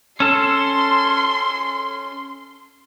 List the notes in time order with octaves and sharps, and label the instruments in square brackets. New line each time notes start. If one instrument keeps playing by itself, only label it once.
[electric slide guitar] C#4 A4 [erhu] C6